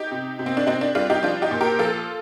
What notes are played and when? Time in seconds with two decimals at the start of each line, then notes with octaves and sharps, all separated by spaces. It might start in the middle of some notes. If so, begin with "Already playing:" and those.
Already playing: D#4 G4
0.11 C3
0.39 C3
0.46 C4
0.57 D4
0.67 C3 C4 D#4
0.81 D4
0.95 G3 D4 F4
1.10 D#4 G4
1.23 F3 D4 F4
1.42 D#4 G4
1.51 A#2
1.61 G4 A#4
1.79 F3 F4 A4